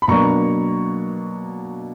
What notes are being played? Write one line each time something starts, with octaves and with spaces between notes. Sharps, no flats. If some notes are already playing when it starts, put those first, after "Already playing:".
B5
B2 F#3 A#3 D4 A#5 C#6